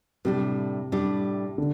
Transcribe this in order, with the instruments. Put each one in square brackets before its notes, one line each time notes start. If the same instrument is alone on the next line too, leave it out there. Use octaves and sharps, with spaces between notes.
[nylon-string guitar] A2 G3 D4 [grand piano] C3
[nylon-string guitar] A2 G3 D4
[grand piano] D3